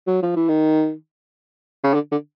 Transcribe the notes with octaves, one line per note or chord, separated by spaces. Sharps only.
F#3
F3
E3
D#3
C#3
D3
D3